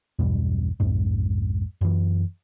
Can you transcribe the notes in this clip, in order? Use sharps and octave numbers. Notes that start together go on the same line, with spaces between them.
B1 E2 G2 B2
B1 F2 G#2
F#2 E3